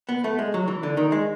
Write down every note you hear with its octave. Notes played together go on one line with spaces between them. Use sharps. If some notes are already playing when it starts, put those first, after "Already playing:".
B3
A3
G#3
F#3
E3
D3
D#3
G#3